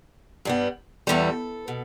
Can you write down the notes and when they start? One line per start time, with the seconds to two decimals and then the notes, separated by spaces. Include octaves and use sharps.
0.45 G2 G3 B3
1.07 E2 E3 G3 A4
1.68 B2